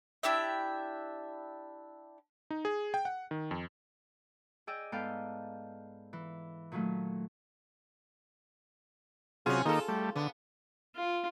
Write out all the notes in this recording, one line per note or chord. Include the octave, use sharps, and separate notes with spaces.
D4 E4 G4 E5
D#4
G#4
G5
F#5
D#3
F2
G#4 D5 D#5 G5 E6
G#2 B3 A4 F5 G5 A5
E3
A#2 D#3 F#3 A3 D#4
C3 F#3 C#4 F4 G#4
D#3 A#3 D#4 F4 A4
G3 A3
D3 B3
F4